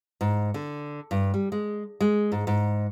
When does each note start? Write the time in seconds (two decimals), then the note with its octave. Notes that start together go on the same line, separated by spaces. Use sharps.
0.21 G#2
0.54 D3
1.11 G2
1.34 G3
1.52 G#3
2.00 G#3
2.32 G#2
2.47 G#2